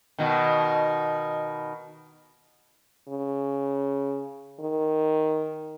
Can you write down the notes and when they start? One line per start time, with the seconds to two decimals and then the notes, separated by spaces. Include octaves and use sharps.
0.18 B2 D#3
3.08 C#3
4.60 D#3